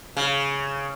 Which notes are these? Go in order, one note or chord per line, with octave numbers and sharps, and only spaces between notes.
C#3